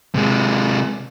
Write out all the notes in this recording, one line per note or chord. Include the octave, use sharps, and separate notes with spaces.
C3 G#3